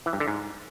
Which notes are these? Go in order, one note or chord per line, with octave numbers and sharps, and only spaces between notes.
E3
G2
D3
G#2